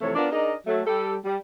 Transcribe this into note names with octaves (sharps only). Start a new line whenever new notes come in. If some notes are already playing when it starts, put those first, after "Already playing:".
F2 C3 E3 A3 C#5
B3 D4 F4 A#4 D5
D4 D#4 G#4 A#4 D5 D#5
F#3 A3
G3 G4 A4
G3